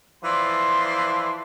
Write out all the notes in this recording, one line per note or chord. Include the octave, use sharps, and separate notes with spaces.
E3 F3 D5 C6